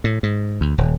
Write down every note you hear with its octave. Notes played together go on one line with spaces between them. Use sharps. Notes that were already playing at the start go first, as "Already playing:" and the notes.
A2
G#2
D2
D#1